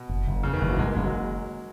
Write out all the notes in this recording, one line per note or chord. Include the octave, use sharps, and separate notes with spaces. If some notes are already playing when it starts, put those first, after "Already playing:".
Already playing: B2
F#1
F#1
E2 C#3
D#3
F#1 E3
F#3
F#1 G#3
A#3
F#1 G#3
F#3